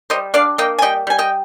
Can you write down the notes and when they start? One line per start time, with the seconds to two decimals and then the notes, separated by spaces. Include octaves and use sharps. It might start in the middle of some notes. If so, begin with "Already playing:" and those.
0.10 G3 C5 D#5
0.34 D4 D5 F5
0.58 A#3 D#5 G5
0.79 G#5
0.82 G3 D#5 G5
1.07 G3 G#5
1.18 D#5 G5